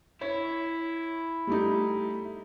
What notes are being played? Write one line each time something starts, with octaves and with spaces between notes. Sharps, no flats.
E4 C#5
G3 A3 D#4